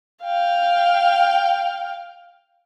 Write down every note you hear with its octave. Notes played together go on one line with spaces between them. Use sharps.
F5 G5